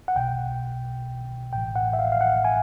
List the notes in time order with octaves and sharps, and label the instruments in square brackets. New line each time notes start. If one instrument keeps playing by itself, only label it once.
[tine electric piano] F#5
B1 B2 G5
A1 A2 E3 G5
F#5
E5
F5
F5
F#5
G#5